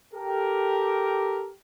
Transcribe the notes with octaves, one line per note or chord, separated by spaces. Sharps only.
G4 A4 A#4